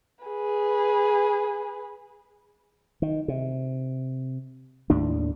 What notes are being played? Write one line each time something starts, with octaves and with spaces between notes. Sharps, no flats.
G#4 B4
D#3
C3
D#2 A2 D4